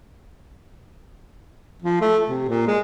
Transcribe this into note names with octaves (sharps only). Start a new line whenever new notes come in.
F3
A3
C3
A#2
G#3